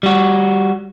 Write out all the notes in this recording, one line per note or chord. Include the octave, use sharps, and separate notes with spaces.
G3 F#4